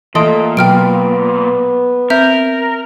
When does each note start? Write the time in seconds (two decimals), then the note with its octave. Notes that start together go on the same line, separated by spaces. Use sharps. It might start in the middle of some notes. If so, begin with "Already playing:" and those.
0.15 A#2 E3 A3 D#5 A5 C6 D#6 D7
0.57 B2 F#3 B3 G5 F6 D7
2.10 C4 A#4 E5 G6